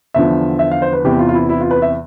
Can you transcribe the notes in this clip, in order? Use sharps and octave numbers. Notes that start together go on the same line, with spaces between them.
E2 D3 F3 E5
E5
F5
C5
B4
E2 C3 E3 G4
F4
F4
E4
E4
F4
B4
E5